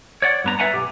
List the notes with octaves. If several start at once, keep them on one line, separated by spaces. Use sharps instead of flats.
C#5 D5 F#5
G2 B3 A#5
B4 C5 E5 F#5 G#5 A#5
B1 G4